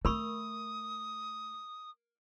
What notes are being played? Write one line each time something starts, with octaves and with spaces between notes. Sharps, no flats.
A3 A#4 B5 C#6 D#6